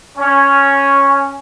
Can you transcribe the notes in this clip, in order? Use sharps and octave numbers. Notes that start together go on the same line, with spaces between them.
C#4